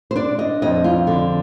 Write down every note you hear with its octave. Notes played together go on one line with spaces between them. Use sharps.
C5
D4 D5
D#5
F2 D#5
F4
D3